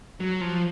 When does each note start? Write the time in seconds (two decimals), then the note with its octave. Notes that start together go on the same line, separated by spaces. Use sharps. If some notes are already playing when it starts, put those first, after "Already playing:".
0.20 F#3
0.41 F3